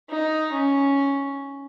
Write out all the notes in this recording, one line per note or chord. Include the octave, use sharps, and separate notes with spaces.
D#4
C#4